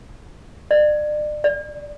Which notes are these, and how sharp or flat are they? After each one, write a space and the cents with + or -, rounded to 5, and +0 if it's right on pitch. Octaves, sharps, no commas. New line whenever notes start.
D5 +35
D5 -5